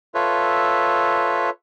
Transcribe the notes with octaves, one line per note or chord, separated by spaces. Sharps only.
F4 A4 B4 C#5 E5